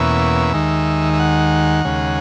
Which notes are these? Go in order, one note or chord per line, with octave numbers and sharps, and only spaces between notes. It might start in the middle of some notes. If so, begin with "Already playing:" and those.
Already playing: E2 B2 A#3 C#4 E5
D#2 D#3 G#3
E5
F#5
D#2 C#3 G#3